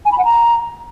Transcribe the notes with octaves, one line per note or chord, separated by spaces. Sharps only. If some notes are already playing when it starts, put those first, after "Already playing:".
G#5
B5
F#5
A#5